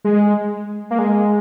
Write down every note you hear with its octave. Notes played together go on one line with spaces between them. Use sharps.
G#3
A#3
G#3